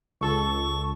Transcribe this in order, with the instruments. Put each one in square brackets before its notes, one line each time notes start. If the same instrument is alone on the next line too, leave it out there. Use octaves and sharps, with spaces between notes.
[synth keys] C#2 A4 [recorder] C#6